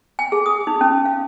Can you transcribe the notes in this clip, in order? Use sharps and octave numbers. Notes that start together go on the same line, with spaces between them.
G#5
G#4
D#6
D#4
C#4
F5